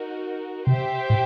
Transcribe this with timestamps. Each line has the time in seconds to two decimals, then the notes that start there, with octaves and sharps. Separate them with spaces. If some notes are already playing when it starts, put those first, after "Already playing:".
Already playing: D#4 F#4 A#4
0.67 C3 G4 C5 E5 G5
1.10 A2